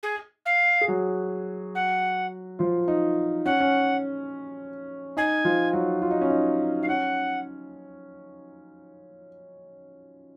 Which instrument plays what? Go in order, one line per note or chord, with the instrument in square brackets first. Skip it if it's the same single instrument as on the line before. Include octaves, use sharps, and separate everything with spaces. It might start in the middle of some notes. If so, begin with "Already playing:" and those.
[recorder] G#4
F5
[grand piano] G#4
F#3 F#4
[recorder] F#5
[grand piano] F3 F4
D#4
[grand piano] C#4 [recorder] F#5
[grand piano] C#4
[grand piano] D#4 [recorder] G#5
[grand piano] F3 F4
F#3 F#4
F4
D#4
C#4
D#4
[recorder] F5
[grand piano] C#4 [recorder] F#5